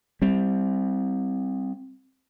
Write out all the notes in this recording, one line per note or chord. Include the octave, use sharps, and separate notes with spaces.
G3 C4